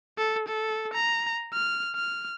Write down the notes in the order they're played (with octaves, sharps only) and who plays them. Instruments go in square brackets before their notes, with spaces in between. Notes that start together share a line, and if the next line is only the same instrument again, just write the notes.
[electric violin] A4
A4
A#5
F6
F6